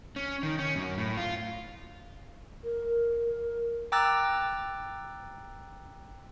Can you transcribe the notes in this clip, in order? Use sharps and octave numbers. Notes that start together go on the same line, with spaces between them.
C#4
D#3
C#4
F#2
A2
F4
A#4
G5 A#5 D6 E6 F#6 A6